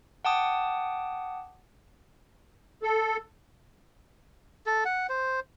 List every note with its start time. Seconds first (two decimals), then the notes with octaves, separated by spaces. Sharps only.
0.25 F#5 G5 A5 D6 D#6
2.83 A4
4.66 A4
4.85 F#5
5.09 C5